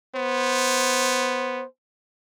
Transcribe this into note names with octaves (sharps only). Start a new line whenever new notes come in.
B3 C5